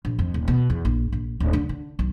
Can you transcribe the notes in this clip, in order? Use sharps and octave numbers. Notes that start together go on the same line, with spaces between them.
A#1
F2
D#1
B2
E2
A#1
A#1
D1
D3
D3
B1